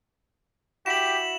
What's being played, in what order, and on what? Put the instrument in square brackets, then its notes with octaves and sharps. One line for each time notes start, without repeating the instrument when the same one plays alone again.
[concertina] E4 F#4 [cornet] G4 [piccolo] B6 [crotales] E7 F#7